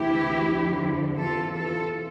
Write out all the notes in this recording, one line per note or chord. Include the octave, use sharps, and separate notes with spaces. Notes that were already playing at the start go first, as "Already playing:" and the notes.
Already playing: D2 C3 E3 E4 G4
F2 D3 F3
E2 C3 E3 F4 A4
F4 A4